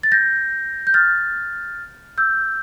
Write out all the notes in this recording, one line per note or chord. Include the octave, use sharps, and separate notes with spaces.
A6
G6 A#6
G6
F6 A6
E6 G6